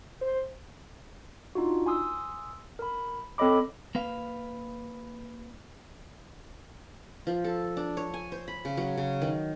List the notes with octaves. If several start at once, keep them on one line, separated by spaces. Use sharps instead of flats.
C5
D4 D#4 F4 F#4
G#5 C6 D#6 E6
A#4 B5
C4 A4 C#5 D#5 B5 D6
A#3 B4 F5
F3
A4
D4
C#5
G#5
C5
B5
C#3
F#3
C#3
D#3